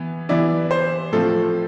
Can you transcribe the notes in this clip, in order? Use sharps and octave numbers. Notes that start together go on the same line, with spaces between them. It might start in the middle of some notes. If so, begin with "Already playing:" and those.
Already playing: E3 B3
E3 B3 E4 D5
C5
A2 F3 A3 C4 F4 A4